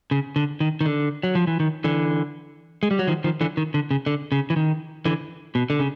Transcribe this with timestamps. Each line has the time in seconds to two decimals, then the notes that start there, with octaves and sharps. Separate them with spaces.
0.11 C#3
0.36 D3
0.60 D#3
0.81 D#3
0.86 D3
1.23 F#3
1.35 F3
1.47 E3
1.60 D#3
1.84 D3 E3
2.83 G#3
2.91 G3
2.99 F#3
3.07 D#3 F3
3.24 D#3 F3
3.41 D3 E3
3.57 D#3
3.74 D3
3.91 C#3
4.06 D3
4.32 C#3
4.50 E3
4.56 D#3
5.05 D3 E3
5.55 B2
5.70 D3
5.79 C#3